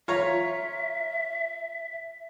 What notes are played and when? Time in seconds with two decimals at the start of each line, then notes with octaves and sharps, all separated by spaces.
0.08 F4 C#5 E5 A#5